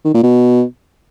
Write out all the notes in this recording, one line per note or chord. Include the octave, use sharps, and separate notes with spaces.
D#3
A#2
B2